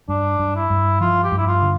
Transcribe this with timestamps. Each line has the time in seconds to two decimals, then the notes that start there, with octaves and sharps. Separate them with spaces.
0.08 G2 D4
0.39 G2
0.56 E4
0.70 G2
1.01 F3 F4
1.24 G4
1.32 G2
1.38 E4
1.47 F4
1.62 D3